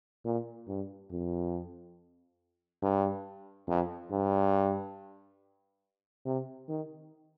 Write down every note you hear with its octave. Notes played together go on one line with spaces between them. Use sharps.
A#2
G2
F2
G2
F2
G2
C3
D#3